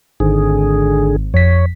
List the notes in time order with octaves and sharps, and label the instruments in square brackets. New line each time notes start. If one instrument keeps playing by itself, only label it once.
[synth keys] G#1 [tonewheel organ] D3 G#4
[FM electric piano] F2 B6 [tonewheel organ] C#5